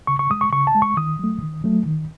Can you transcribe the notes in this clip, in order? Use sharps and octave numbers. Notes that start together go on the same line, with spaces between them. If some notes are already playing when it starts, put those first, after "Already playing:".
C#3 C#6
C#6
G#3 D#6
C#6
C#3 C#6
A5
G#3
C#6
D#3 D#6
F#3 A3
D#3
F#3 A3
D#3